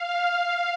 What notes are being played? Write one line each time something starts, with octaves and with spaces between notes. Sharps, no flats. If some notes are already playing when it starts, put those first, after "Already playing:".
Already playing: F5